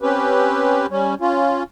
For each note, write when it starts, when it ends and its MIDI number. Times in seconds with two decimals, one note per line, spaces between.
0.02 0.87 60
0.02 0.87 61
0.02 0.87 67
0.02 0.87 71
0.90 1.15 55
0.90 1.15 61
1.21 1.63 61
1.21 1.63 65